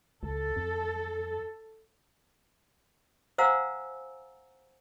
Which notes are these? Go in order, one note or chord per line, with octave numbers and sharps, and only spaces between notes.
C#2 A4
F2
C5 F5 F#5 G#5 A#5 E6